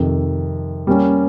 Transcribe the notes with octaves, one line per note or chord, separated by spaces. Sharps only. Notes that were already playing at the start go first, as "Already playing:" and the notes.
Already playing: F2 C3 D#3
G3 A#3 C#4